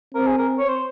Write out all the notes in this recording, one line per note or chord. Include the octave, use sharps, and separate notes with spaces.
C4 A#4
G#4
A#4
C#5
C5